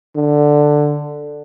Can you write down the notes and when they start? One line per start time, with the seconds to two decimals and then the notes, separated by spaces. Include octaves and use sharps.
0.16 D3